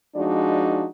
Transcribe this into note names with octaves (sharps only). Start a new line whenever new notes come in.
F3 G#3 D4 D#4 F#4 D5